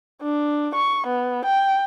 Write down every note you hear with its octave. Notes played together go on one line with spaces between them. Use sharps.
D4
C#6
B3
G5